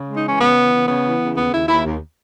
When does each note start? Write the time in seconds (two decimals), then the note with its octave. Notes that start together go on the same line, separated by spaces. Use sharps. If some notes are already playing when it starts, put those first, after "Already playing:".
Already playing: C#3
0.08 G#3
0.17 D#4
0.24 E3 C#4
0.40 C#3 B3
0.57 E3
0.73 C#3
0.88 C#3 B3
1.04 E3
1.21 C#3
1.37 D#2 B3
1.53 D#2 E4
1.68 D#2 E4
1.85 D#2